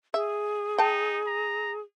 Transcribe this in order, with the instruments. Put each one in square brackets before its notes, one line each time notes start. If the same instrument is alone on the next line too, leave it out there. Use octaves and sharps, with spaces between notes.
[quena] G#4 [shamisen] E5
[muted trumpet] D#4 [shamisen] G5 A5
[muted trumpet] A#5